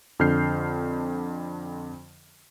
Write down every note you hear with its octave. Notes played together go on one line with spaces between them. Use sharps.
F2 D3 F6 G6 C7